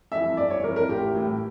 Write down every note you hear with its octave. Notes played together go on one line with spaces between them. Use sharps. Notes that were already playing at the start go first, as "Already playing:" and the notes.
F2 E3 E5
G1 D5
C#5
F2 E3 A#4
A#4
A1 G4
A2 E3